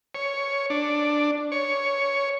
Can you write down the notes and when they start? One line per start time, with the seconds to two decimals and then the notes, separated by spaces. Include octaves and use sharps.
0.15 C#5
0.70 D4
1.52 C#5